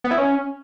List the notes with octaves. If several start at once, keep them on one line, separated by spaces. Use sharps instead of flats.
B3
E4
C#4